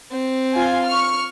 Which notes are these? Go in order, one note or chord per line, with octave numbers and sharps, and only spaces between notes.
C4
F4 G#5
C#6 F6